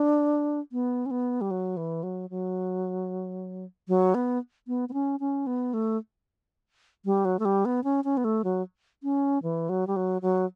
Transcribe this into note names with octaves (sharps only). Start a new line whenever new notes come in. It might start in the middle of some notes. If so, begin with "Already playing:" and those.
Already playing: D4
B3
C#4
B3
G3
F#3
E3
F#3
F#3
F#3
B3
B3
B3
C#4
C#4
B3
A3
G3
F#3
A3
G3
B3
C#4
C#4
B3
A3
F#3
C#4
E3
F#3
G3
F#3
F#3